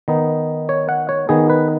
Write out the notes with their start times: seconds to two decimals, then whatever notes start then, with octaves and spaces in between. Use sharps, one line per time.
0.08 D#3 B3 D#4
0.69 C#5
0.89 F#5
1.09 C#5
1.29 D#3 B3 D#4 G#4
1.50 B4